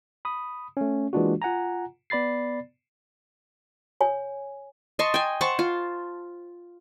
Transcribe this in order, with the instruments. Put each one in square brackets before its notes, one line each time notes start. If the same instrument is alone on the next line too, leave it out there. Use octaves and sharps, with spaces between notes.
[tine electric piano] B5 D#6
A3 C#4
E3 G#3 A#3 D4 F4 F#4
F4 F#5 G#5 A#5
B3 D5 B5 A6 C7
[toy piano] C#5 G#5
[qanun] D#5 A5 C6 C#6
G5 G#5
C5 F#5 A5 C#6
F4